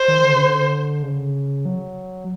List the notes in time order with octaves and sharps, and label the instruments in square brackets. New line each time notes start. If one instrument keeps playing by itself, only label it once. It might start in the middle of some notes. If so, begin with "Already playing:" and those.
Already playing: [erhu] C5
[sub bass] D#3
D3
C#3
D3
C#3
F#3